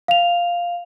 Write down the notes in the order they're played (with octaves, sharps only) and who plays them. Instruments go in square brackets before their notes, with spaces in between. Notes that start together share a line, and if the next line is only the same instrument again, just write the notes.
[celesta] F5 F7